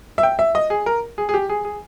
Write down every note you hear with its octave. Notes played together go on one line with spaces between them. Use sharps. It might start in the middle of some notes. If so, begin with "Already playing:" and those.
E5
G5
E5
D#5
G#4
A#4
G#4
G#4
G4
G#4
G#4